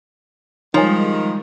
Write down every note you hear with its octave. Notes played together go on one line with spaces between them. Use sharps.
D#3 F3 G3 G#3 D#4 C#5 G#5